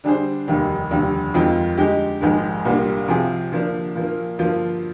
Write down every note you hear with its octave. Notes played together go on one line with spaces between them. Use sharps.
D3 G3 D4 G#4 C5
F1 D#2 D#3 G3
F1 D#2 D3 G3
F2 D#3 G#3 C4 F4
D3 G#3 D#4 G4
A#1 G#2 D#3 G#3
C2 A#2 G3 A#3 D4
C3 F3 C4 F4 G#4
D3 F3 A#3 D4
A#2 F3 A#3
G2 D3 F3 A#3 F4